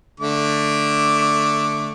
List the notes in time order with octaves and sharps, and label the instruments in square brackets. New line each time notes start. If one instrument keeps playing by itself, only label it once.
[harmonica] D3 A3 D6